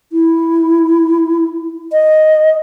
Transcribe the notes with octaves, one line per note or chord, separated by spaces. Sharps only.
E4
D#5